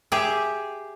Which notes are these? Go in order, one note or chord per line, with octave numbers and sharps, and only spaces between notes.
G4 G#4 E5